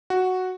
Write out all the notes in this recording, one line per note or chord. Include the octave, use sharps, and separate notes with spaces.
F#4